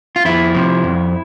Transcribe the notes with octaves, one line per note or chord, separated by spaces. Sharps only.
F4
F2 E4
C3 F3
F2